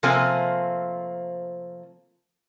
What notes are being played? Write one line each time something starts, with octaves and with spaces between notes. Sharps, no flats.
C3 F3 A3 A#3 C4 G#5